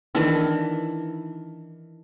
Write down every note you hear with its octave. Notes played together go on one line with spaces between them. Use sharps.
D#3 E3 D4 A4